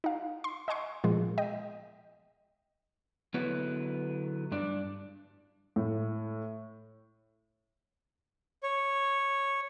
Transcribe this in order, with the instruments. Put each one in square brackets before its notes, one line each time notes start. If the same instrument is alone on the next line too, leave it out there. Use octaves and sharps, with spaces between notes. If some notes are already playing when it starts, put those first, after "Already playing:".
[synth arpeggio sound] D#4 F5
C6
D#5 F#5 G#5 C6 C#6
A#2 F3 G#3 B3
D#5 G5
[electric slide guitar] D3 F#3 B3 E4 B4
G2 D4
[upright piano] A2
[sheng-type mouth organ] C#5